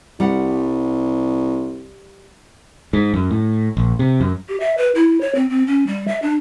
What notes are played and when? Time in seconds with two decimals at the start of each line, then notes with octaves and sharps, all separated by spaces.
0.20 C2 G3 F#5
2.93 G#2
3.14 F#2
3.31 A2
3.77 A#1
3.99 C3
4.20 F#2
4.49 G4
4.60 E5
4.78 B4
4.95 E4
5.21 C#5
5.35 C4
5.49 C4
5.67 C#4
5.87 G3
6.08 E5
6.22 D4